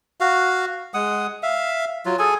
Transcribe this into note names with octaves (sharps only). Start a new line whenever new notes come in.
F#4 F5
G#3 F#5 D#6
E5 F5
F#3 F4
G#4 A4 G#5